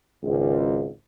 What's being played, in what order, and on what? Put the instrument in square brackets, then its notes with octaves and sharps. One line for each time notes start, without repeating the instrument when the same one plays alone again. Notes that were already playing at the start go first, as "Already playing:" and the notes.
[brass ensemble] G#1 C#2